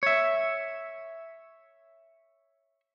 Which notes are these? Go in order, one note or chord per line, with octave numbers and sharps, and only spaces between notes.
C#5 E5